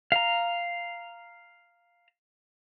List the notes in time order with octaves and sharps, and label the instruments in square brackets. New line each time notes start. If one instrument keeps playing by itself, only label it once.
[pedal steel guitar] F5 A#5